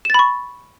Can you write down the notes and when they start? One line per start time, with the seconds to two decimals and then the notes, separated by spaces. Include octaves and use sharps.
0.05 E7
0.10 A6
0.14 B5
0.19 C#6